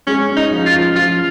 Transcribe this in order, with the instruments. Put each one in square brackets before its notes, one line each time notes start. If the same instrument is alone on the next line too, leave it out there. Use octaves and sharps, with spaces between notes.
[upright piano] G#3 [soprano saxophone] C#4
[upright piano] C#4
[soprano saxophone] D#4
[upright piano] F3
[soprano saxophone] F4
[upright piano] F3
[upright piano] F3 [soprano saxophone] F4